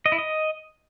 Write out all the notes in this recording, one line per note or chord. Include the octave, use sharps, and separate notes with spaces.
D#5
E4
D#5